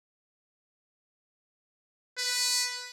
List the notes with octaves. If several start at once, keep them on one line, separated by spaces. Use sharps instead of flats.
B4